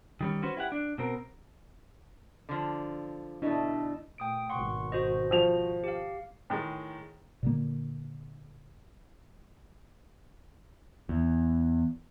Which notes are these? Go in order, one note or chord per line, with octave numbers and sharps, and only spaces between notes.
D#3 G3 C#4
C#4 F#4 B4 C5
E4 G4 F#5
D4
B2 C4 A#4
D3 F3
B2 A3 D4 E4 D#5
A#2 A3 G5 D#6 D7
G#1 B2 F#5 C6 C#6
F#4 C5 D#5
F3 F7
G4 F5
A2 D#3 G#3
A#2 D3 A#3
E2